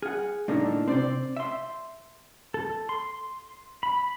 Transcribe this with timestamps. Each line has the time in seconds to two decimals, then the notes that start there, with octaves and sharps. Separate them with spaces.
0.02 G#4 F#5 F6
0.48 A2 D3 A#3 D4 D#4
0.88 C3 C4 C5 D5
1.36 E5 C6
2.54 A4
2.89 C6
3.83 B5